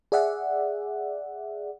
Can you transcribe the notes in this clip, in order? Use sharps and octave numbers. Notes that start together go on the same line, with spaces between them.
G#4 D5 E5 F#5